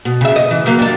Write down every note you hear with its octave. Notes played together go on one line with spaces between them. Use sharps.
B2
C#3 E5
D#5
E3
C#3 F#3 A#3
G3 D4